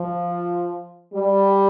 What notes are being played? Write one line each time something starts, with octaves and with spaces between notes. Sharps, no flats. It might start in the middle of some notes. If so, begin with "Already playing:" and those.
Already playing: F3
G3